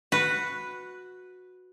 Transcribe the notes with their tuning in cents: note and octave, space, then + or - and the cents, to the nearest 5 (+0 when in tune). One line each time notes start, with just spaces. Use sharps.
F#4 -10 B4 +0